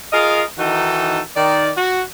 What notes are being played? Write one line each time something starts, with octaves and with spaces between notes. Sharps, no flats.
F4 G#4 A#4 D#5 F5
D#3 E3 D#4 F#4 A4
D#3 D5
F#4